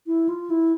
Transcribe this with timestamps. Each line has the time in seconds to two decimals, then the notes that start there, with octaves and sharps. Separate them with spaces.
0.07 E4
0.29 F4
0.50 E4